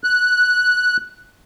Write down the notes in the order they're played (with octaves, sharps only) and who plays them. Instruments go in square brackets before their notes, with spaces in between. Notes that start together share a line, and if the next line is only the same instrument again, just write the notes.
[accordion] F#6